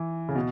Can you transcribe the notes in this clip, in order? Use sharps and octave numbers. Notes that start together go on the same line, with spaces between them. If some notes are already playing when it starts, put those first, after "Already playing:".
Already playing: E3
C#3
B2